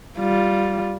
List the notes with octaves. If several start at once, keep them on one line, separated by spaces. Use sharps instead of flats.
G3 F4